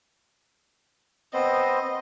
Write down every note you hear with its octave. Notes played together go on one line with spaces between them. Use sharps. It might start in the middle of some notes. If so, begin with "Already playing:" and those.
B3 C4 C5 D#5